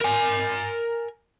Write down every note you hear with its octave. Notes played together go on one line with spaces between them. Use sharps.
A#4 G#5